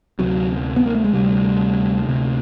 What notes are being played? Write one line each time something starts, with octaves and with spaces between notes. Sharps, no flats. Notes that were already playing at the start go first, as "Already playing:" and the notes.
D2 C3 F#3
B3
A#3
A3
G#3
D2 C3 G3
D2 C3